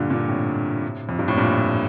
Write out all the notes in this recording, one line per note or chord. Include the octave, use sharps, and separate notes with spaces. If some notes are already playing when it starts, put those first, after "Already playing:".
Already playing: G2 A#2 D3
A#2 D3
A2 C3
F2
G2
A2
G2 A#2